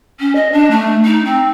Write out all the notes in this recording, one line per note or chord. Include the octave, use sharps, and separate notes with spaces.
C#4
D#5
D4
A3
D#4
C4